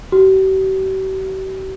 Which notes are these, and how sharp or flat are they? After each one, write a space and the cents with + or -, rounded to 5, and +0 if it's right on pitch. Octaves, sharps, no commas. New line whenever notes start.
G4 -45